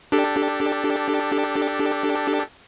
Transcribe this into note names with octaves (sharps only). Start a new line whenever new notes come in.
D4 G4 A4